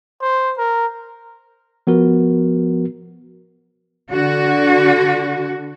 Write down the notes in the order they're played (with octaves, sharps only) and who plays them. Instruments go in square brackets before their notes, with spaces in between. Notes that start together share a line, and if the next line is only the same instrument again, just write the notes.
[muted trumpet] C5
A#4
[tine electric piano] F3 B3 F#4 A#4
[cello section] D3 F#4